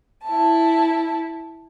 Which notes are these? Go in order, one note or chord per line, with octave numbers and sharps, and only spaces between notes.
E4 A5